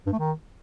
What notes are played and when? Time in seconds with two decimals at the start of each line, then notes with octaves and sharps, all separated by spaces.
0.07 G2
0.13 A3
0.19 D#3